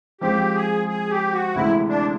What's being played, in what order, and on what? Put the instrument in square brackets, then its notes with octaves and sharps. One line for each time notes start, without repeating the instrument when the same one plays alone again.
[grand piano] F3 G#3 C4 [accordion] G4
[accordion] G#4
G#4
G4
F#4
[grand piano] D2 C3 E3 G#3 [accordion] E4
[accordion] D4